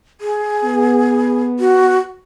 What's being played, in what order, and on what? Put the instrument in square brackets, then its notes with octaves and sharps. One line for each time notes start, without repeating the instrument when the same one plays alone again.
[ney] G#4
[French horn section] B3
[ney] F#4